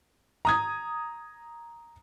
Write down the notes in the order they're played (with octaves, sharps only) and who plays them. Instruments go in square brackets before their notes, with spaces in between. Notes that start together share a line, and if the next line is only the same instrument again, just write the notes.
[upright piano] A#5 D#6 G#6